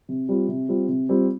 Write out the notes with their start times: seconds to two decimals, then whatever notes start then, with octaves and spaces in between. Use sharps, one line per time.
0.09 C3
0.29 G3 C4 F4
0.48 C3
0.69 G3 C4 F4
0.89 C3
1.09 G3 C4 F4